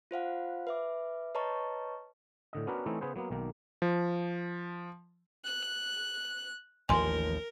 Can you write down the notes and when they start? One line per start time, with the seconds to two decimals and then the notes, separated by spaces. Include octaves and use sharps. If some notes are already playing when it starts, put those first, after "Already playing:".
0.11 F4 C5 F5 F#5
0.67 B4 E5 D6
1.35 B4 C#5 D#5 A5 A#5 C#6
2.53 A2 D3 D#5
2.67 B3 C#4 D4 F#4 A#4 B4
2.86 E3 A3 C4 C#4 D#4 E4
3.01 C#3 B3 G#4 B4 C5
3.16 F#3 A#3 B3
3.31 B1 D#3 A#3
3.82 F3
5.45 F#6
6.89 A1 D#2 F3 A#4 G#5 C6